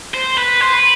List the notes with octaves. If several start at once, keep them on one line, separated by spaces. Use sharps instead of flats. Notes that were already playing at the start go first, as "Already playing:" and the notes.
C5
B4
C5
B4